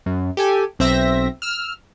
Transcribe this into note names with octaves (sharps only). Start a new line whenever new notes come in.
F#2
G4 A4 G#5
B1 C4 C5 E5 A#6
E6 F6